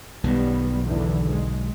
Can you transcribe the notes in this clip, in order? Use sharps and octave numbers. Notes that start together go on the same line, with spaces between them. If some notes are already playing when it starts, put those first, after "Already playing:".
B1 D#3 G3 B3
E2 D3 E3
G#3